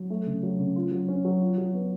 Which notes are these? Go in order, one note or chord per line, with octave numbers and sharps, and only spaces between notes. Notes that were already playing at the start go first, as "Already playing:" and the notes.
Already playing: F#3
A3
C#3
F#3
C#3
F4
F#3
C#4
F#3
F4
F#3
B3